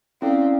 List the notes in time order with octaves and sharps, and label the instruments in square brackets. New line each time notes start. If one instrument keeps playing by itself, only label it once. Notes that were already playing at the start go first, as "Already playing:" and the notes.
[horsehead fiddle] C4 [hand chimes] C#4 E4 A4 D5 F5